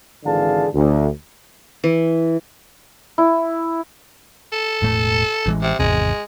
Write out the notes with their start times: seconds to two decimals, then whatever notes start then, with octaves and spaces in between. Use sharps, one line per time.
0.25 G#1 D3 E3 G#4 F5 A5
0.73 D2
1.84 E3
3.18 E4
4.52 A4
4.82 E1 A2 A3
5.46 A1 E3 G#3
5.62 C3
5.79 G#1 E2 C3 G#3